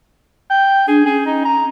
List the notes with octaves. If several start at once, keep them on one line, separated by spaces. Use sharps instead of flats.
G5
D4 G#4
C#4 G#4
D#4
A#5